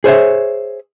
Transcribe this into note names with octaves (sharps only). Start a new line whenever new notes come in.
G#4 C5 C#5 E5